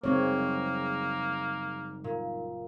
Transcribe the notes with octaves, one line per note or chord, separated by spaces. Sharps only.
F#1 G3 G#3 A#3 C4 D#4 F#4 C#5
A#2